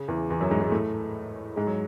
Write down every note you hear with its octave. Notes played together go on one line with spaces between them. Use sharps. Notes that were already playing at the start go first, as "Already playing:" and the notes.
Already playing: C#3
E2 E3
E2 E3
F#2 F#3
G#2 G#3
G#2 G#3
A2 A3
G#2 G#3
F#3